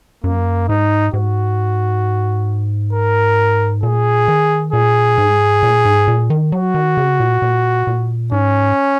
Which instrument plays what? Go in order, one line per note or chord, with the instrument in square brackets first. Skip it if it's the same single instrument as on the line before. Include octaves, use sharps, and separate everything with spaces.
[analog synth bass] F#2 [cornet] A#3
[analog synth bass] G#2 [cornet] D#4
[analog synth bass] G#2 [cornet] F#4
[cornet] A#4
[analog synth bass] A#2 [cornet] G#4
[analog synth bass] D#3
[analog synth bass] A#2 [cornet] G#4
[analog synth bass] G#2
A#2
G#2
A#2
D#3
[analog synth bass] F#3 [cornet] F#4
[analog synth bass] D#3
C#3
A#2
A#2
A#2
[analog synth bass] G#2 [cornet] C#4